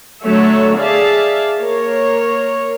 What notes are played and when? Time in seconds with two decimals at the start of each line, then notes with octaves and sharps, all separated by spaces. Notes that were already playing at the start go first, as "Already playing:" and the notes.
0.23 D3 F#3 A3 A4 C#5 E5
0.78 G#4 D5 E5 F5 A5
1.60 A#3 A#4 C#5